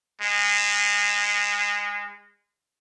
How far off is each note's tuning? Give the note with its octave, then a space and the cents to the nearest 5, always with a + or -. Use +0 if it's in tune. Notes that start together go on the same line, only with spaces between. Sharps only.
G#3 -25